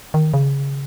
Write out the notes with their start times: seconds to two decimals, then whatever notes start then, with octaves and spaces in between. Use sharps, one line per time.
0.14 D#3
0.34 C#3